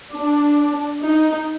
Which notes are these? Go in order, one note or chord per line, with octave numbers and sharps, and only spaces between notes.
D4
D#4